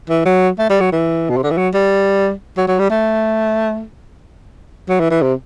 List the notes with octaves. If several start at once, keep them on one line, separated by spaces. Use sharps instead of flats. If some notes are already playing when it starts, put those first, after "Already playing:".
E3
F#3
A3
G3
F#3
E3
B2
C3
D3
E3
F#3
G3
F#3
F#3
G3
A3
F#3
E3
E3
C3